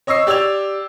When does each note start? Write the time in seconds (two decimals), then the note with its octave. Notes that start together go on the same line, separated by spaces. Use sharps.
0.07 C#5 D#5 C#6 E6 C7
0.27 G4 D5 E6 G#6 F7